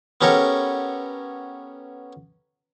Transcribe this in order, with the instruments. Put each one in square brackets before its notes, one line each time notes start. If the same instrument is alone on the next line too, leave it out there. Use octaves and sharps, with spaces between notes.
[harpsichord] B3 C#4 G4 A4 A#4 C#5